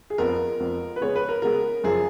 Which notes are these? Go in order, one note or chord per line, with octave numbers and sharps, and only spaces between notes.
G#4
F2 F3 B3 A#4
F2 F3 B3
B4
C#3 G#3 B3 C#5
B4
A#4
C#3 G#3 B3 A#4
F#2 C#3 F3 G#4